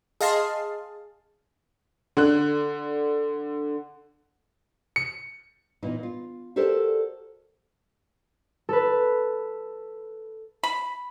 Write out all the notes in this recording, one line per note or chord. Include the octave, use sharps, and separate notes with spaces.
G#4 D#5 F5 A5 C6
D3 F#6
C#7
A#2 E3 B3 D#4
F4
F#4 G4 A4 A#4 C5 D5
A4 B4
B5